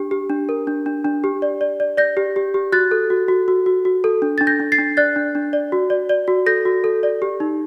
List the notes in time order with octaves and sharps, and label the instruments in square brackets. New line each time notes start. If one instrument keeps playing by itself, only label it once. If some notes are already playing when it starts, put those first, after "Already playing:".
Already playing: [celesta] D4 G4
G4
D4
A#4
D4
D4
D4
G4
D5
D5
D5
D5 G6 A#6
G4
G4
G4
F#4 F#6 A6
A4
F#4
F#4
F#4
F#4
F#4
A4
D4
D4 A6
G6 A#6
D4
A6 C7
D4
D5 F#6 A6
D4
D4
D5
F#4
D5
D5
F#4
A4 G6 A#6
F#4
A4
D5
G4
D#4